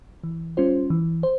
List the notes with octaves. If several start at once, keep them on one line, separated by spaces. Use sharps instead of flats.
E3
G3 C#4 F4 C5
E3
C5